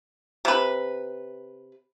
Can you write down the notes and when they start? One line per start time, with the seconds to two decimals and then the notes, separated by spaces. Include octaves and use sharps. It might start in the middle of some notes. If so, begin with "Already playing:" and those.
0.45 C3 B4